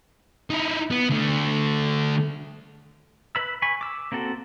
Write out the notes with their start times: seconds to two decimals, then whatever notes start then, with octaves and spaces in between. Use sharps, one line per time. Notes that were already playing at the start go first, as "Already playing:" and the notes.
0.50 D#4 E4
0.91 B3
1.10 D3 A3
3.35 B4 B5 E6
3.62 G#5 B5 C#6
3.81 D6 E6
4.12 A#3 C4 F#4 A4